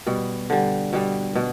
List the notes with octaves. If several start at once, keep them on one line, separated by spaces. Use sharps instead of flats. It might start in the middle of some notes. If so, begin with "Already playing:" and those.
B2 G3
D3 G3
B2 G3
B2